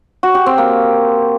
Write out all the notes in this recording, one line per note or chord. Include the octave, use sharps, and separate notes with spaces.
F#4
G4
C4
A#3